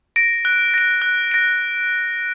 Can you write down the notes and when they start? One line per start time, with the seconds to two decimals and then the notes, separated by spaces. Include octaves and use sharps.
0.16 A#6 D7
0.45 F#6
0.74 A#6 D7
1.02 F#6
1.32 A#6 D7